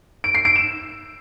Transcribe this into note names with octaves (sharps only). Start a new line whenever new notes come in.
D7
C7
D7
E7